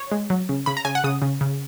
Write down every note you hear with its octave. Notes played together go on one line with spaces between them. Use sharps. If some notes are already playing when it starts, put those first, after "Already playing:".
Already playing: C#5
G#3
F#3
C#3
C#3 B5
A#5
C#3 G#5
F#5
C#3 D#6
C#3
C#3